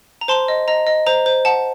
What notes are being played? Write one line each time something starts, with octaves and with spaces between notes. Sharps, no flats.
A#5
C5 A5 C6
D#5
D#5 A#5
D#5
C5 A#5
C5
F#5 A5